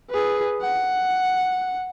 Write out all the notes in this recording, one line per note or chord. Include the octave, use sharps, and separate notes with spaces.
G#4 B4
F#5